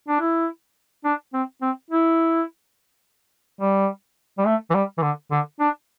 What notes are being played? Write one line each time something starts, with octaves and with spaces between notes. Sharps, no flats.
D4
E4
D4
C4
C4
E4
G3
G3
A3
E3
G3
E3
D3
D3
D4